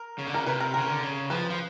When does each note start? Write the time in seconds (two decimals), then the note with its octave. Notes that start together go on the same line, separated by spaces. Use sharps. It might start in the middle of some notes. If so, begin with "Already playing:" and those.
Already playing: A#4
0.19 C#3
0.27 D3
0.34 C#3 A#4
0.46 C3 B4
0.60 A#4
0.74 C#3 A#4
0.89 D3
1.03 C#3
1.30 F3 B4
1.50 F3